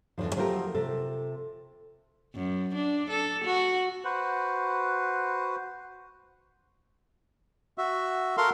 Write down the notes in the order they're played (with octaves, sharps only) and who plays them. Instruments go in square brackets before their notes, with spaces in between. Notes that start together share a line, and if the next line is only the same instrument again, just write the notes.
[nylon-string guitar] E2 D3 D#3 F3
F3 F#3 A3 F4 G4 A#4
C3 F4 A4
[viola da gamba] F#2
D4
A4
F#4
[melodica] F#4 B4 C5
[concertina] F#4 E5
F#4 A4 A#4 F5 C6